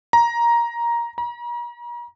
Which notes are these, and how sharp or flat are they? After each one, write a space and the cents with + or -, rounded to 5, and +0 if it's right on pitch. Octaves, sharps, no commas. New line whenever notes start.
A#5 +10
A#5 +40